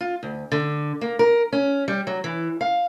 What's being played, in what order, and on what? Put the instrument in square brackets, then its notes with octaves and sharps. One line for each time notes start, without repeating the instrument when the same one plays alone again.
[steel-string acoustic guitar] F4
D2
D3
A#3
A#4
C#4
G3
F#3
E3
F5